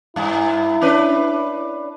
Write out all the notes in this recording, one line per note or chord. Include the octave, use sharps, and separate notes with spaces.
G2 E4
C#4 D4 B4